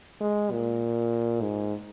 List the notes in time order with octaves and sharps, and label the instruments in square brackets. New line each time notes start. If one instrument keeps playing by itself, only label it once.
[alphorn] G#3
A#2
G#2